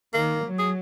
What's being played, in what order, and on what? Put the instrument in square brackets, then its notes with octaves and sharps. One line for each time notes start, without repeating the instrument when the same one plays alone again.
[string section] D#3 [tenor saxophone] A#3
[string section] F#3
[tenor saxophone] G#4